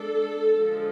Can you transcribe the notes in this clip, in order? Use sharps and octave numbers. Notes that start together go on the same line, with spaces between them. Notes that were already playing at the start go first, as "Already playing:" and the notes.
Already playing: G#3 D4 A4
D3 F3 G#3